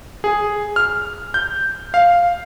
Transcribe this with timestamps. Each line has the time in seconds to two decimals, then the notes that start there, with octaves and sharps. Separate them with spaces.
0.24 G#4
0.76 F6
1.34 G6
1.94 F5